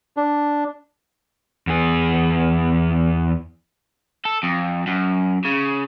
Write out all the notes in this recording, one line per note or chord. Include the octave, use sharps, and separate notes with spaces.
D4
E2 G#4
A4
F2
F#2
C#3